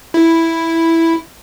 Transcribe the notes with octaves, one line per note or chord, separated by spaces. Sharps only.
E4